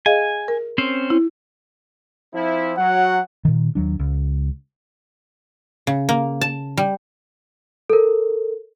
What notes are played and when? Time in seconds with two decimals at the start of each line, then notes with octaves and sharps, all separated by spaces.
0.06 G#4 D#5 F5 G#5
0.48 A#4
0.78 C4 C#4 C5
1.10 E4
2.34 F3 C4 E4
2.78 F#3 F#5
3.45 A#2 D#3
3.75 D#2 F#3 D4
3.99 C#2
5.87 C#3
6.09 A#3
6.41 A5
6.77 G3
7.90 A4 A#4